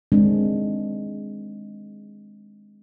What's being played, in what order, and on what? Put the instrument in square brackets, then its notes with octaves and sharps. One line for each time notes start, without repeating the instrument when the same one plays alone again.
[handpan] D#3 G#3 C4 D4